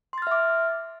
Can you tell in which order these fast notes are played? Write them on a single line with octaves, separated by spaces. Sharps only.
C6 A6 F6 E5 D6